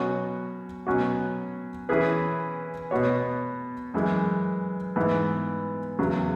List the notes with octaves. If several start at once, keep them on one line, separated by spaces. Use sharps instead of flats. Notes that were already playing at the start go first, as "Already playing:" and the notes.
Already playing: B2 F#3 C#4 F#4 C#5
B2 F#3 C#4 F#4
E3 C#4 E4 G#4 B4
B2 B3 F#4 C#5
F#2 E3 G#3
G#2 E3 B3
E2 C#3 F#3